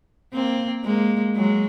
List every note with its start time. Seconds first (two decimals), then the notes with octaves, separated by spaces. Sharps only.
0.33 A#3 C4
0.84 G#3 A#3
1.35 F#3 G#3